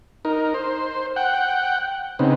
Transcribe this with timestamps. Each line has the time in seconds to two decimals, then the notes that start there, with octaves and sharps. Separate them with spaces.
0.25 D#4 A#4
0.54 C5
1.16 F#5 G5
2.19 C#3 B3 C4 D#4